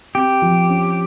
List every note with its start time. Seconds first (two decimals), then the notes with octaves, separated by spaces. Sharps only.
0.15 C4 G4
0.42 F3
0.69 C#4